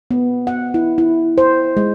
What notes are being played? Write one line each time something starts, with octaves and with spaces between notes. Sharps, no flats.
B3
F#5
E4
E4
C5
G#3